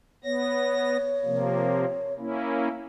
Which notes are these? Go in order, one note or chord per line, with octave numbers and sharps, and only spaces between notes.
B3 C#5 A#6
C3 F3 A#3
A#3 C#4 E4